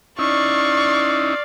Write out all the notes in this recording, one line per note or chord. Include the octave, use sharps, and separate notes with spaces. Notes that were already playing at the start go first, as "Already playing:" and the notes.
C#4 D#4 E4 D5 F5 C#6